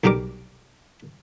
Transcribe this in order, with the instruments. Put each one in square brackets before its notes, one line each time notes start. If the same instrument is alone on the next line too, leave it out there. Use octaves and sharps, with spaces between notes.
[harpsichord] B1 C3 G3 A#4 D6